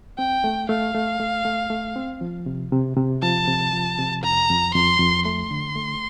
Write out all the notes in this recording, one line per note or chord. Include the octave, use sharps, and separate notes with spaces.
C4 G5
A3
A3 F5
A3
A3
A3
A3
C4
F3
C3
C3
C3
F3 A5
C3
F3
C3
F2 A#5
F2
F2 C6
F2
A3 C6
D3
A3